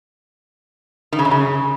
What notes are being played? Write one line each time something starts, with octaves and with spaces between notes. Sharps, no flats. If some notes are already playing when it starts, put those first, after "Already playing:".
D#3
C#3
F#2
C#3